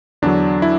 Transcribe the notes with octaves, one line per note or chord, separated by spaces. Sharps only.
E2 D3 F#3 D4
E4